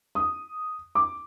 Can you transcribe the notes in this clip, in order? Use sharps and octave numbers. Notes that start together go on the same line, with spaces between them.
D#6
D6